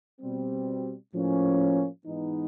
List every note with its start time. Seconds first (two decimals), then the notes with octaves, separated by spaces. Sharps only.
0.21 B2 G3 C4
1.13 A2 F3 A#3 C#4
2.06 G#2 E3 G#3 B3 D#4